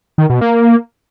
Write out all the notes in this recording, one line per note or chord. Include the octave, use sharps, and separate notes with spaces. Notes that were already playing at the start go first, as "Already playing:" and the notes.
D#3
B2
A#3